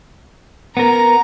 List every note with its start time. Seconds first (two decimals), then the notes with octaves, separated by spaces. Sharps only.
0.77 B3 A#4 A#5